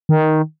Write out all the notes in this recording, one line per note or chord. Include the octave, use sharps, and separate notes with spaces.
D#3